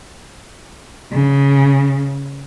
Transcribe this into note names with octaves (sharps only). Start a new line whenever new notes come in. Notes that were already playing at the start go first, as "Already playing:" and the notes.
C#3